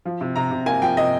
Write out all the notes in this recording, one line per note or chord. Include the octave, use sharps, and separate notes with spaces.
F3
C3
C3 A#5
C3
A#3 G#5
F3 G5
C3 D#5